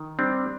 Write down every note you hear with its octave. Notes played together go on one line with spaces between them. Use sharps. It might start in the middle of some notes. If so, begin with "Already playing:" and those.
Already playing: D#3
G3 C4 D4